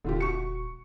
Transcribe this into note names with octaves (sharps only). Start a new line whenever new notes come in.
D#1 D3 F4 G4
F#4 C#6 C#7